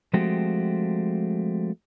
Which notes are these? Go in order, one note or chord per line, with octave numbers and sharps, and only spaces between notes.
F3 G#3 A3 C4 F#4 G4